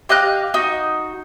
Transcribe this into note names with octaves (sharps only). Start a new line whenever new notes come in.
G4 D#5 F5 F#6
D#4 F#4